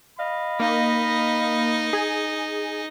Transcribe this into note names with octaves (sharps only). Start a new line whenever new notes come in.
D#5 F5 B5
A#3 D#4
G#4